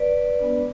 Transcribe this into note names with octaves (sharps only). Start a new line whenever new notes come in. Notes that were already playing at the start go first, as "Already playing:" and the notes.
Already playing: B4 D5
G#3 B3 D4